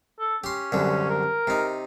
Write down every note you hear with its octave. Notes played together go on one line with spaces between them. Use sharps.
A4
C#4 G4 C6
C2 F#2 D3
A#4
C3 D#4